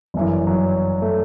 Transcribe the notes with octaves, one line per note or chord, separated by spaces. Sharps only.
G1 F#2 E3
F#3
A3